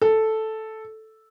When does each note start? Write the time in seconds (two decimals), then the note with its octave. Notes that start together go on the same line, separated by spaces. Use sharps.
0.01 A4